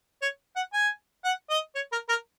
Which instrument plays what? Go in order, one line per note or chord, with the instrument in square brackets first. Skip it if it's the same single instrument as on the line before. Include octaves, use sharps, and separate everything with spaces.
[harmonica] C#5
F#5
G#5
F#5
D#5
C#5
A#4
A#4